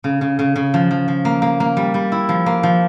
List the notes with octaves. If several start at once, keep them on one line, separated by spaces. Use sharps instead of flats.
C#3
C#3
C#3
C#3
F3
F3
F3
A#3
A#3
A#3
G3
G3
E4
F3
A#3
F3